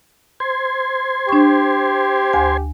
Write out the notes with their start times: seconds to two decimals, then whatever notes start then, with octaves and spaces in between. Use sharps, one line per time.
0.40 C5 C6 G#6
1.29 D4 G4 C#6
2.33 D2 G#5